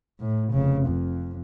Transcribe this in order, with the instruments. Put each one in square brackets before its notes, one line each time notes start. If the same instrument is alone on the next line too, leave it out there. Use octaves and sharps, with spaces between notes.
[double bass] A2
F1 C#3
F2